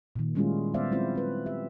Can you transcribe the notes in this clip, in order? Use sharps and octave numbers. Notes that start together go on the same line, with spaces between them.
A#2 D#3
G3 G#3 C#4 E4 F4 G#4
B3 E4 C5 D5 E5 F5
F#3 G#3 C4 E4 F4 C5
C4 B4
G4 E5